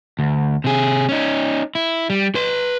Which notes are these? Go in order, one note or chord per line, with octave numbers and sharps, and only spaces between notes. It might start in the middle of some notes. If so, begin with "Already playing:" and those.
D2
C3 G#4
C#4 D#4
E4
G3
B4 C6